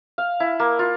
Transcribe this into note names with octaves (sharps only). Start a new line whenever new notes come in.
F5
E4
A#3
F4